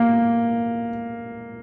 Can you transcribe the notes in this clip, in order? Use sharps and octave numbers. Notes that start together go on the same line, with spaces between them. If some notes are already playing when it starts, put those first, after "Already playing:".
Already playing: A#3